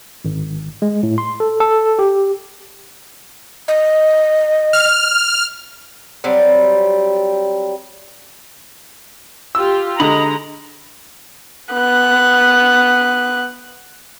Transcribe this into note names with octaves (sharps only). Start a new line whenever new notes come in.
G#1
G#3
A2
C6
A4
A4
G4
D#5
F6
F#3 G3 C4
F4 G4 E6
D3 G#3 D#5 A#5 B5
B3 F#6